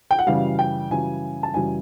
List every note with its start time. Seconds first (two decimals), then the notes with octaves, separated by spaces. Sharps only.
0.11 G5
0.19 F#5
0.27 F#2 C#3 E3 G3 F5
0.59 G5
0.91 F#2 C#3 E3 G3 G#5
1.43 A5
1.54 F#2 C#3 E3 G3 G#5